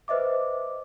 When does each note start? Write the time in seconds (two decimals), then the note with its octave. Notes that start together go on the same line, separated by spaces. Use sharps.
0.08 B4 C5 D#5 E5 D6